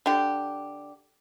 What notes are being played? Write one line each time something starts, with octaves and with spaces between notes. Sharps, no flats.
D3 G4